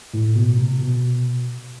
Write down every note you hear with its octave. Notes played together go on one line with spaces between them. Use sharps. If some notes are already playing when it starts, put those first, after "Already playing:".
A2
B2
C3
B2